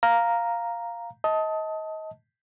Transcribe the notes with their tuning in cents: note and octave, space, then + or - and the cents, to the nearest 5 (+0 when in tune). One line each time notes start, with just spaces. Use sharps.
F5 +0 A#5 +0
D#5 +25 A5 +0